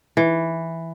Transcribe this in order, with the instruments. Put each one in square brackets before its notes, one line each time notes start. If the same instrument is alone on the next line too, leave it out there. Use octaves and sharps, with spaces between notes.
[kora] E3